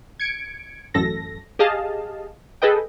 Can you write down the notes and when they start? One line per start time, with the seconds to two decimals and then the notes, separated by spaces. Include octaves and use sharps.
0.20 G#6 C#7 D7
0.94 A1 F#2 A4 A#6
1.59 G4 G#4 D#5 F5 A5
2.62 G#4 A4 B4 D#5 G5